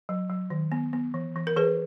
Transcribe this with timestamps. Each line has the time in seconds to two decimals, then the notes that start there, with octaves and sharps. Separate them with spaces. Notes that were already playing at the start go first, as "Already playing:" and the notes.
0.09 F#3
0.30 F#3
0.50 D#3
0.72 B3
0.93 B3
1.14 E3
1.36 E3
1.47 A#4
1.56 E3 G#4 B4